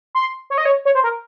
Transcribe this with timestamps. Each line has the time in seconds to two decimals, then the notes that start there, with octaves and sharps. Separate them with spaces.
0.15 C6
0.50 C#5
0.58 D#5
0.65 C#5
0.85 C#5
0.95 C5
1.04 A#4